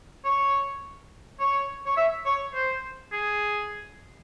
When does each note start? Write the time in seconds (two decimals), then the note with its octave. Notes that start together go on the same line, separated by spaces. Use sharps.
0.25 C#5
1.40 C#5
1.86 C#5
1.97 E5
2.26 C#5
2.55 C5
3.13 G#4